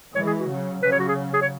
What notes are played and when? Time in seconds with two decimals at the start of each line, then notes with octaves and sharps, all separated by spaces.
0.15 E3 G#3 C#5
0.27 G#4
0.39 F#4
0.49 C#3 F#3
0.82 C#3 F#3 B4
0.92 C#5
0.99 F#4
1.08 G#4
1.33 G#4
1.42 C#5